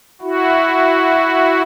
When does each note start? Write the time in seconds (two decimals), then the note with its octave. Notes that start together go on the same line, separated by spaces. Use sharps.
0.21 E4 F#4